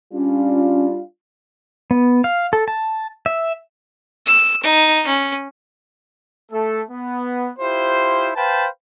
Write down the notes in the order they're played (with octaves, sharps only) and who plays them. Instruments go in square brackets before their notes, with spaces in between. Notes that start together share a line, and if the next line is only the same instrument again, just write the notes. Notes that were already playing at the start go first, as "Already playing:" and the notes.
[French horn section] G3 D4 F4 [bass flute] C#4
[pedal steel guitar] B3
F5
A4
A5
E5
[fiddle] E6
D#4
C#4
[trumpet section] A3 A4
B3
E4 F4 G4 C5
B4 C5 F5 G5 A5 B5